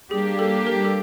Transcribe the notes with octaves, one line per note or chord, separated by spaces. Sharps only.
G3 A#3 D4 G4 G#4
A4
A#4
A4